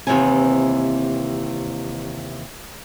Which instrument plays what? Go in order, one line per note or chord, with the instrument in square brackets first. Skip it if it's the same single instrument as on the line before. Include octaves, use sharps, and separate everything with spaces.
[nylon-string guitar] D#2 C3 E3 B3 C4 G#5